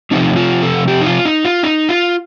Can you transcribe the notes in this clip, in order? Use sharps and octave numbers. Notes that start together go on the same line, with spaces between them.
C3 F3 A3 C4 D#4
F4
A4
G4
D#4
F4
D#4
F4
D#4
F4